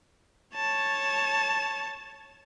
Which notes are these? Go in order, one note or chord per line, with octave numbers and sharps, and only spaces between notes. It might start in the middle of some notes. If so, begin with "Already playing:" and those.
C#5 A5